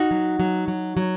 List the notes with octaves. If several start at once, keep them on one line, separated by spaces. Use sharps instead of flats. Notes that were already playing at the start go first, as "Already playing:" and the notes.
Already playing: D#4 F#4
F#3
F#3
F#3
F#3